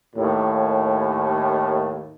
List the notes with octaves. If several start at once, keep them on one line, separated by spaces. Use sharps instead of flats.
D#2 A2